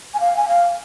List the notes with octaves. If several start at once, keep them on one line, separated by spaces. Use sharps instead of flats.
G#5
F5
G#5
F5